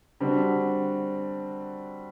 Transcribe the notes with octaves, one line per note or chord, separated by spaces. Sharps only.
D3 G3 C4 F#4